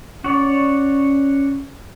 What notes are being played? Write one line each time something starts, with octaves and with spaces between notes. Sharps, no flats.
C#4 F#4 C#5 D5